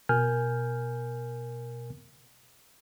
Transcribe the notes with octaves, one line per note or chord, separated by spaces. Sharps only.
B2 A#4 G#5 F6 G6